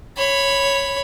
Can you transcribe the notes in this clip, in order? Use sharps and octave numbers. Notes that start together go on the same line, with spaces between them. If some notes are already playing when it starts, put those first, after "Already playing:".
C#5 B5